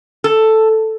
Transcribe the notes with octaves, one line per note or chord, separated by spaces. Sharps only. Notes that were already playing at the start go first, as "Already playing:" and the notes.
A4